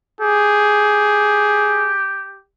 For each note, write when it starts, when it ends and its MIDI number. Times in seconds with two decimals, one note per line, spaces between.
0.21 2.43 67
0.21 1.93 68